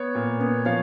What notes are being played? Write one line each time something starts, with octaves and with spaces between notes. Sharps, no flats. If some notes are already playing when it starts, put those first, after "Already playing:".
Already playing: B3 C#5
A#2
B3
F3 C#5 F5